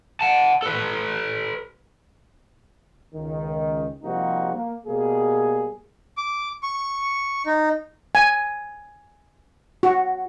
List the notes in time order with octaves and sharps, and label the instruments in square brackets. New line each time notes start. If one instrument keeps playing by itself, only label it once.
[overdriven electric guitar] F#5 A5
A4 B4
[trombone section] C#2 D#3
C3 F3 G3 A#3 D#4 F#4
A#3
B2 G3 A#3 G#4
[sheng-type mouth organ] D6
C#6
D#4
[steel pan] G#5
F#4